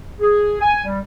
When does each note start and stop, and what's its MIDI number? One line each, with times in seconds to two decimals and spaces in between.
0.20 0.57 68
0.61 0.81 80
0.85 0.99 55